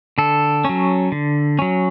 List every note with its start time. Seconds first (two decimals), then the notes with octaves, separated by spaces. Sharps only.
0.18 D3 A4
0.65 F#3 C#4
1.12 D3
1.59 F#3 C#4